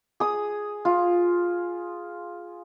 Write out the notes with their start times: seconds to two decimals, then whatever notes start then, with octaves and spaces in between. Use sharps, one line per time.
0.20 G#4 D#6
0.85 F4